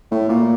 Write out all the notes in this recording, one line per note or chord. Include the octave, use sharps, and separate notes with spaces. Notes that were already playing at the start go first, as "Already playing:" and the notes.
A2
A#2